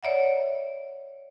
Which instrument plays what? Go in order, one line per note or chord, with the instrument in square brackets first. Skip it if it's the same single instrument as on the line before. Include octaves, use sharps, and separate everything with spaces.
[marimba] C#5 D5 E5 F#5